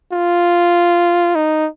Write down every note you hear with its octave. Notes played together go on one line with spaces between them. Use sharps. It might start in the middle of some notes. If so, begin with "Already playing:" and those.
F4
D#4